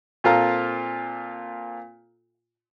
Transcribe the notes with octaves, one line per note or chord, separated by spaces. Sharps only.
A#2 C4 F4 A4 F5 A#5